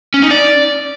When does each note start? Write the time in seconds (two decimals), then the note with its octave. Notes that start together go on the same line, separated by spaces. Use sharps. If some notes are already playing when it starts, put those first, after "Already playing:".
0.14 C#4
0.22 D#4
0.31 D5